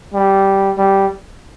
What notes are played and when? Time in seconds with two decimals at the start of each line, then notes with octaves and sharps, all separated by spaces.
0.14 G3
0.78 G3